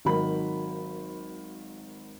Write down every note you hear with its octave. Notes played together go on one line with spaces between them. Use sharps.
G#1 D#3 F#3 B5